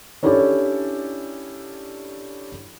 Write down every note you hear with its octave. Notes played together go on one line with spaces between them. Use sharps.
C#4 D4 E4 G4 A4 C#5